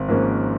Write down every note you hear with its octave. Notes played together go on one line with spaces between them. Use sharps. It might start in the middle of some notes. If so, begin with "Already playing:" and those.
Already playing: G#1
G#2 F3 A#3 C#4